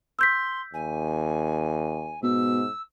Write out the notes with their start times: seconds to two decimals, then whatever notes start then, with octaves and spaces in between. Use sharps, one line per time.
0.19 C6 E6 G6 B6
0.74 D#2 G#5
2.23 G#2 B2 E6